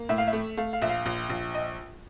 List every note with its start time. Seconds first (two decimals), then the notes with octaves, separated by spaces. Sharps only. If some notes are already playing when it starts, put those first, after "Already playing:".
Already playing: A#3
0.09 A2 E5
0.18 F5
0.27 E5
0.33 A3
0.57 A3 F5
0.73 F5
0.82 A#1 E5
0.89 F5
1.06 A#1
1.30 A#1
1.55 D#5